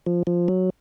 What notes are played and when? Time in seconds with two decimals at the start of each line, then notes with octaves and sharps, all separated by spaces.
0.06 F3
0.27 F3
0.48 F#3